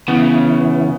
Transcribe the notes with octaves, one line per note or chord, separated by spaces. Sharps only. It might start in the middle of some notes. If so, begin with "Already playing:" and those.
C#3 E3 B3